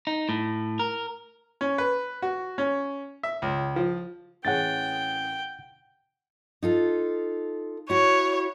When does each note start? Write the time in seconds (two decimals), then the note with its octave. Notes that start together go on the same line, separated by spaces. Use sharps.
0.07 D#4
0.29 A2
0.79 A#4
1.61 C#4
1.78 B4
2.22 F#4
2.58 C#4
3.23 E5
3.42 C#2
3.76 F3
4.45 A1 G#4 C#5 F#5 G5 A6
6.63 D#4 F4 A4
7.90 E4 F#4 C#5